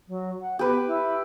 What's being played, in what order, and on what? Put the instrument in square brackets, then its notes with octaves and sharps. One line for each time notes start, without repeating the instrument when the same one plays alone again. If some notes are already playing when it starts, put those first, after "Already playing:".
[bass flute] F#3
F#5
[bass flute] B3 [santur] G4 B4
[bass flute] E4